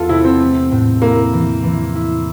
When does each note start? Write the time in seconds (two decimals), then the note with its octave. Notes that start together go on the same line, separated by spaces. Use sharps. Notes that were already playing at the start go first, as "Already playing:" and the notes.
Already playing: E2 F4 A4
0.09 C3 E4
0.24 C4
0.40 A3
0.71 A2
1.02 A#3 E4
1.33 E3
1.64 E3
1.95 E4